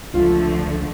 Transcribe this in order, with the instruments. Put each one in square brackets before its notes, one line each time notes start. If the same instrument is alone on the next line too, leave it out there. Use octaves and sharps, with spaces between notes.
[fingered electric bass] C#2 [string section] D3 F3 A3 [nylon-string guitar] F4 F5